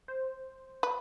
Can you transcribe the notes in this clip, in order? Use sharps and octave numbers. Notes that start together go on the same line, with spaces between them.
C5
B4